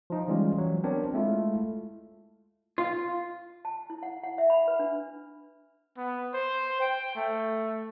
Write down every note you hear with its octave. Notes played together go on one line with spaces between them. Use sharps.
F3 D#4
E3 G3 G#3 C#4 F4
E3 F#3
B3 C4 D4 A#4 C#5
G#3 A3 E4 F4
F4
A5
E4
F#5
F#5
E5
B5
B4
D4
B3
C5
G5
A3